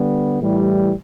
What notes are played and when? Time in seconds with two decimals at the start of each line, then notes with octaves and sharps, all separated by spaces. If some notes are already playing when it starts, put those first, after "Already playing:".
Already playing: D3 G3 B3
0.39 A2 E3 G3